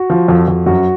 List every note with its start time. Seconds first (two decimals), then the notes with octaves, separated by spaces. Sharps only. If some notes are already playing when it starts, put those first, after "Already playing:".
Already playing: F#4
0.10 F3
0.28 F2
0.48 F2
0.66 F#2 F#4